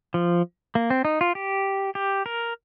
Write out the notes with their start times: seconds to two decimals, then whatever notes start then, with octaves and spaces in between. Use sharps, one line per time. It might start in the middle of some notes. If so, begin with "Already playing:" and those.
0.14 F3
0.75 A#3
0.90 C4
1.05 D#4
1.21 F4
1.35 G4
1.95 G4
2.26 A#4